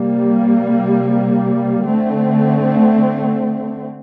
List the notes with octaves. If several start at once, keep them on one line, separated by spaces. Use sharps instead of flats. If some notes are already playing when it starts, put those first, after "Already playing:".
Already playing: C3 G3 A#3
D3 A3 C4